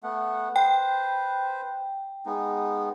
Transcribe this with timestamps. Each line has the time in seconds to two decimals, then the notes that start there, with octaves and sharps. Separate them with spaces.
0.03 A3 B3 F#5
0.56 B4 C5 G5
2.26 G#3 B3 D#4